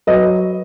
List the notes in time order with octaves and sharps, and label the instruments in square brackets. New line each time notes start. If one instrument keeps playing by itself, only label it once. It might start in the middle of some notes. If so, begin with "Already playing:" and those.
[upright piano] F#3 B4 D#5